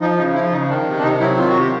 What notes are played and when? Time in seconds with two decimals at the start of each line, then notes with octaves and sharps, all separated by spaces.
0.01 F3 D#4
0.18 C#3 D#4
0.35 F3 E4
0.52 C#3 D#4
0.69 D#3 D4
0.86 C3
0.98 D4
1.03 C3 D#4
1.20 F#3 E4
1.37 D#3 F4
1.48 F#4
1.54 C3
1.60 G4